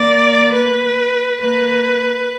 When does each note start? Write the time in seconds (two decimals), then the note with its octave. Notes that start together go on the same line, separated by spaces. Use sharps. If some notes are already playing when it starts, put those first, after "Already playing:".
Already playing: A#3 D5
0.53 B4
1.41 A#3 B4